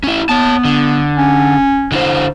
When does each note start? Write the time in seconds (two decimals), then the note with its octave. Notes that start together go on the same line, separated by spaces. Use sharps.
0.03 C#4 E4
0.29 B3 C#5 A5
0.65 D3
1.17 C#4
1.92 D3 E4 C5